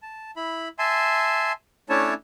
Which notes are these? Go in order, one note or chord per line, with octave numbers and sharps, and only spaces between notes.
A5
E4 B5
E5 G#5 A5 C6
A3 C#4 D4 E4 C#5 A5